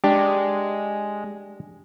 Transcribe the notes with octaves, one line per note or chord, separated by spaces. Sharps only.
G#3 D4 G4